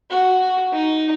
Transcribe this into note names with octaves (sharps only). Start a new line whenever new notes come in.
F#4
D#4